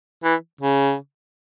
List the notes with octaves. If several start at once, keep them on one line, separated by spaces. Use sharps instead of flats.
E3
C#3